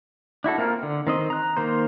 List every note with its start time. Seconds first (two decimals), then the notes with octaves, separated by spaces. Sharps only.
0.44 D4 E4 F#4 A4
0.58 A#3 C4 F4 A#4
0.83 D3
1.07 D#3 C4 D#5
1.30 A#5 F#6
1.57 D#3 A#3 C5